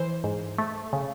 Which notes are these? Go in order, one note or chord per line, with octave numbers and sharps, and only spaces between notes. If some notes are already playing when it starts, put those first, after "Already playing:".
Already playing: E3 C5
G#2
A3
C#3